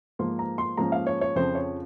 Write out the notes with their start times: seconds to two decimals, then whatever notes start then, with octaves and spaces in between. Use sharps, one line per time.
0.19 G#2 F3 A#3 C6
0.39 A#5
0.58 C6
0.77 G#2 F3 A#3 C#4 A#5
0.92 F5
1.07 C#5
1.21 C#5
1.36 F2 C#3 F3 C5
1.55 C#5